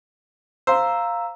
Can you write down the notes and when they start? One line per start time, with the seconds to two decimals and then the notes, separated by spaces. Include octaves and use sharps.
0.67 C5 F5 A#5 E6